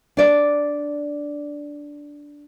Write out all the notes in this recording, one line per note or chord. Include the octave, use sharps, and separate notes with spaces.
D4 D5